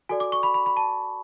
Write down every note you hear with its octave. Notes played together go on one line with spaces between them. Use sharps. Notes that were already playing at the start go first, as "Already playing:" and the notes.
F#4 A4 D5 G#5
D6
C#6
B5
B5
B5
A5